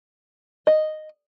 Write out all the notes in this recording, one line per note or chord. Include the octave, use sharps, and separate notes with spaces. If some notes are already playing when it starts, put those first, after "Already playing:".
D#5